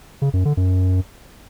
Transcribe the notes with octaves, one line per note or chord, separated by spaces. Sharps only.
C#3
F#2
D3
F#2